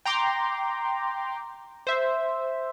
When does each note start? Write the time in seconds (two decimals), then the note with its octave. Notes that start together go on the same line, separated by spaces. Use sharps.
0.05 G5 A#5 C6 D6
1.87 C5 E5